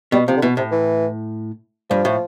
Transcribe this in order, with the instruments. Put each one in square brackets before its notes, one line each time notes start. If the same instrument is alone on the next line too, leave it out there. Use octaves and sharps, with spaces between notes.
[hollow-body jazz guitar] B2 [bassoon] G3
[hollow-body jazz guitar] C3 [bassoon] F3
[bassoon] D3
[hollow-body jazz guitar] B2 [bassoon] E3
[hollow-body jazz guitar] A2 [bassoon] C3
[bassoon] E3
[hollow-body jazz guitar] G2 [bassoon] F3
[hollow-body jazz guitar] A2